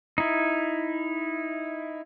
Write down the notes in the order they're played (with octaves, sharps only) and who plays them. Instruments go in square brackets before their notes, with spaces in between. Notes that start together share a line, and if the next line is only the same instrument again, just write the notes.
[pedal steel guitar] D#4 E4